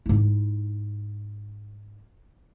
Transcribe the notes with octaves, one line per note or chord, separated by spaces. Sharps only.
G#2 E4